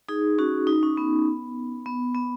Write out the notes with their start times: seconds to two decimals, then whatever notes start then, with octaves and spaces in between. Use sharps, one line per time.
0.09 D#4 G#4
0.38 C#4 F#4
0.67 D#4
0.83 C#4
0.97 B3
1.86 B3
2.15 B3